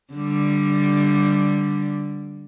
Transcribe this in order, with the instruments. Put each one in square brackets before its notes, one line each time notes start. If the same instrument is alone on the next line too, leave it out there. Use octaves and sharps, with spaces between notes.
[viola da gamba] D3 G3